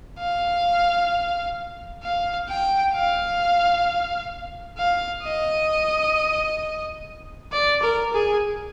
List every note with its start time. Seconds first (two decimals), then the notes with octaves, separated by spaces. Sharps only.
0.19 F5
2.03 F5
2.49 G5
2.94 F5
4.77 F5
5.23 D#5
7.52 D5
7.82 A#4
8.14 G#4